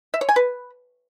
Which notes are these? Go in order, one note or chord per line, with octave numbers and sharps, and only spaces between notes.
E5
C#5
G#5
B4